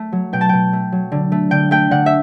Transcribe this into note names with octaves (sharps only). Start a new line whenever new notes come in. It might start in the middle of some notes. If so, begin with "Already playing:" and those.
Already playing: A3
F#3
B2 G5
A5
B2 G5
A3
F#3
D3
A3
D3 G5
A3 G5
D3 F#5
E5